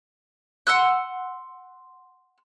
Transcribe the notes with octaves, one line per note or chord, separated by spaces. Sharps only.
F#5 C6 E6 F#6